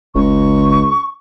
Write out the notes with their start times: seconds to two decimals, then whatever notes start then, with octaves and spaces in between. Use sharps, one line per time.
0.15 F#1 C#2 C#6